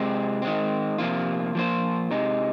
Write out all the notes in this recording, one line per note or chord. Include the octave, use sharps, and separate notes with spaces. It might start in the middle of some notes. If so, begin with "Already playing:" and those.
Already playing: C3 G#3 C4
D#3 G#3 C4
C3 F3 A#3 F4
F3 A#3 F4 C5
C3 G#3 D#4